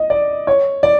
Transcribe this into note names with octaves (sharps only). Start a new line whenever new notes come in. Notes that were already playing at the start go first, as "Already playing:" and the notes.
Already playing: D#5
D5
C#5
D5